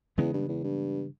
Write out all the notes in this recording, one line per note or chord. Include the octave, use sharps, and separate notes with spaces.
E2 C#3 E3 G#3 B3
G2
E2
G2